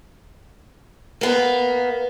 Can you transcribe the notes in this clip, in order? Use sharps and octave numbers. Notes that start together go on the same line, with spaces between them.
A#3 B3